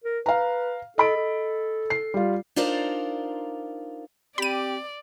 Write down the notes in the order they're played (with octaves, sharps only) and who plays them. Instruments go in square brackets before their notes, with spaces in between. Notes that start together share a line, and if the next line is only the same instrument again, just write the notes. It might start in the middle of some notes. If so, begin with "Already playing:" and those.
[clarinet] A#4
[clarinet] B4 [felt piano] F5 A#5
[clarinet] A4 [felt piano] D#5 B5 D7
[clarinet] A4
[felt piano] C7
G3 F4
[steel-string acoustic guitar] D4 D#4 F4 A#4 C5 D5
[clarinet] C4 [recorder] G4 [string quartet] D5 [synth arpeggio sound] B5 D#7